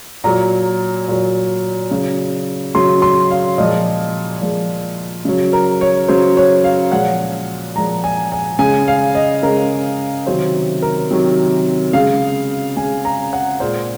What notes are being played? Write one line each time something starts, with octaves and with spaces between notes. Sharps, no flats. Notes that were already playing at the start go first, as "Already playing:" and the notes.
A#2 F#3 A#5
A#2 F#3
C#3 F#3
C#3 F#3 C6
C6
F5
A#2 F3 G#3 D#5
A#2 F3 G#3
C#3 F#3
A#4
C#5
C#3 F#3 C5
C#5
F5
A#2 F3 G#3 F#5
A#2 F3 G#3 A#5
G#5
G#5
C#3 G#3 G#5
F5
D#5
C#3 G#3 A#4
C3 D#3 F#3 C5
A#4
C3 D#3 F#3
C#3 G#3 F5
C#3 G#5
G#3
A#5
F#5
A#2 G#3 C5